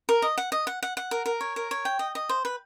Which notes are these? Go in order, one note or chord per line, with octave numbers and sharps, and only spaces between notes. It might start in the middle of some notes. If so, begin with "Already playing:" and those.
A#4
D#5
F#5
D#5
F#5
F#5
F#5
A#4
A#4
C#5
A#4
C#5
G5
D#5
D#5
C5
B4